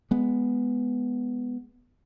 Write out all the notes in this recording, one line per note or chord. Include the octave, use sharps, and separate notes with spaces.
G#3 B3